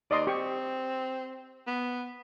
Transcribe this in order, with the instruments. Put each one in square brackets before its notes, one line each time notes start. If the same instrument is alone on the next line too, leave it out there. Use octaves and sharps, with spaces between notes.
[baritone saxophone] D#2 [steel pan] D5 D#5 C6
[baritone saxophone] C4 [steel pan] G4 C#6
[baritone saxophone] B3